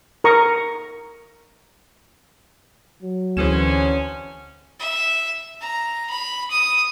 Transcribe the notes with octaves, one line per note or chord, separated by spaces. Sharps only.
A#4 A#5 C#6 D#6
F#3
D2 D3 E3 C4 C#4 G#4 E7
E5
A#5
B5
D#6